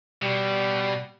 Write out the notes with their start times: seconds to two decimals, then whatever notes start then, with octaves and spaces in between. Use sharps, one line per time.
0.23 B2 G3